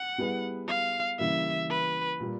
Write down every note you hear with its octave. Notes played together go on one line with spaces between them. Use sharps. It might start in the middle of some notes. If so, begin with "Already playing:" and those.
Already playing: F#5
G3 B3 E4 G#4 B4
F5
C#3 E3 G3 A#3 E5
B4
A#2 G3 A#3